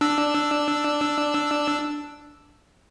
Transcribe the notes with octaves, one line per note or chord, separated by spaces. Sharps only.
D4 E6